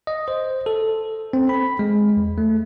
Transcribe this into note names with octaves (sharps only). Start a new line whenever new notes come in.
D#5
C5
A4
C4
B5
G#3
E2
A3